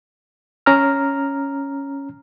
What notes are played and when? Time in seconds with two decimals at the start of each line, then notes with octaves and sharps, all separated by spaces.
0.66 C#4 A#5 F6